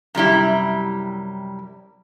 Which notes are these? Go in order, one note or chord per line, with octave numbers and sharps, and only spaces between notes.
F#2 C3 G3 E4